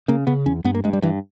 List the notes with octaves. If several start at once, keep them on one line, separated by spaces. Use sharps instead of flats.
C#3 A#3
C#3 B3
E2 C#4
G2 B3
A#3
G2 G#3
G3
G2 E3